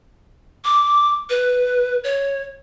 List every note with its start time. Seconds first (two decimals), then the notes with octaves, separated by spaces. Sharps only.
0.65 D6
1.30 B4
2.04 C#5